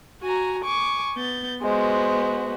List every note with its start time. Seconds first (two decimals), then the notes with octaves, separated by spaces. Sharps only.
0.22 F#4 G#5 A#5
0.63 G#5 C#6 D6
1.17 B3 G6 A6
1.62 G#3 B3 F#4 C5